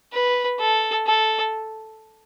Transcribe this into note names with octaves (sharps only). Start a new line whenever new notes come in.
B4
A4
A4